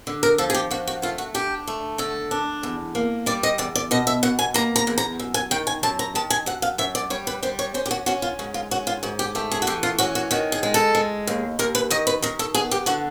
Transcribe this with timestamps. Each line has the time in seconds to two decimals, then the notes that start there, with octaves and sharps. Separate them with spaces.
0.07 D3
0.23 A#4
0.38 F3 A4
0.50 G#4
0.54 G4
0.71 F3 F#4
0.87 F#4
1.02 A3 F4
1.18 F#4
1.34 D4 G4
1.67 A3
1.98 D3 A4
2.31 D4
2.63 E2
2.95 A#3
3.26 G3 D5
3.43 D#5
3.58 E2 D5
3.75 D5
3.91 B2 D#5
4.07 E5
4.23 B2 F#5
4.39 G#5
4.54 A#3 A#5
4.76 A#5
4.87 E2
4.98 A#5
5.19 F#2
5.34 G#5
5.51 D#3 G5
5.67 G#5
5.83 F#2 A5
5.99 A#5
6.15 D#3 A5
6.30 G#5
6.46 F#2 F#5
6.62 F5
6.78 F#2 E5
6.95 D5
7.10 G3 C#5
7.27 B4
7.43 G3 C5
7.59 C#5
7.74 C#4 C5
7.86 G4
7.91 F#4
8.06 C#4 F#4
8.22 F4
8.39 G#2 F#4
8.54 F4
8.71 C#4 F#4
8.87 F4
9.03 G#2 F#4
9.19 G4
9.35 A3 G4
9.51 G#4
9.62 F#4
9.67 E3 G4
9.83 F4
9.98 C#4 F#4
10.15 F#4
10.31 D#3 F#4
10.52 G#4
10.63 G#3
10.74 A4
10.95 G#3
11.27 D#2
11.59 D#2 A#4
11.75 B4
11.90 D#3 D#5
12.07 B4
12.22 D#3 A#4
12.39 A4
12.54 B3 G#4
12.71 G4
12.86 D3 F#4